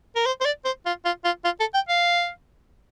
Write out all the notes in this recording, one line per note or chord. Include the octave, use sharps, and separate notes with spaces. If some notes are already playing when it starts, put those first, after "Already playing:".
A#4
C5
C5
D5
C5
F4
F4
F4
F4
A4
G5
F5